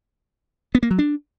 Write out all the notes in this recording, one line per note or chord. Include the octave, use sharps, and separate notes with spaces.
B3
A#3
F#3
D4